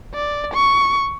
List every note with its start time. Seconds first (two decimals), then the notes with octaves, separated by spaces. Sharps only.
0.14 D5
0.54 C#6